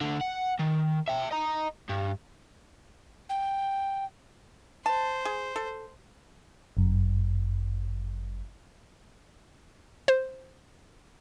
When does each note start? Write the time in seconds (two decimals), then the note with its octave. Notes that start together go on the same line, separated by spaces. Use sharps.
0.01 D2 D3
0.21 F#5
0.59 D#3
1.08 E5 G5
1.31 D#5 A#5
1.89 G2
3.29 G5
4.86 C5 A5
5.25 G#4
5.56 A4
6.77 G1 F#2
10.08 C5